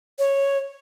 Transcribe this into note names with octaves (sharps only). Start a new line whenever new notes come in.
C#5